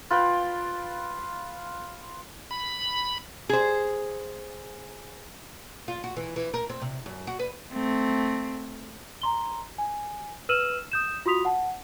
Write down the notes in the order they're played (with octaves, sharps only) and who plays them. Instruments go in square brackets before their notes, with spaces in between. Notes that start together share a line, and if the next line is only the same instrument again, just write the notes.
[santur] F4 B4 G5
[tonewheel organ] B5
[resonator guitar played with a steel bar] G#4 C5
[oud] F4
F#4
E3
E3
A#4
C4
C3
F#2
F#4
B4
[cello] A3 C4
[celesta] A#5 C6 G7
G#5
B4 E6 F6 D#7 E7 F#7
D#6 G6 E7
F4 F#4 C6 D#6 B6 F7
F#5 A5